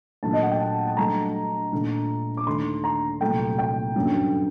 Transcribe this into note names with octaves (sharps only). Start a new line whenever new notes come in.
A#1 A#2 F#3 A3 A5
D#5
F#5
G5
A5
A5
G2 F#3 A3 A#5
A#1 A#2 A3
D6
D#2 D3 A3 C6
A#5
C2 A#2 F#3 A3 G5
G5
G1 F#2 F#3